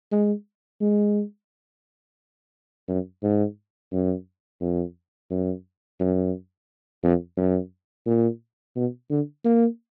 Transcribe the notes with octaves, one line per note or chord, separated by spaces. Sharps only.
G#3
G#3
F#2
G#2
F#2
F2
F#2
F#2
F2
F#2
A#2
B2
D3
A#3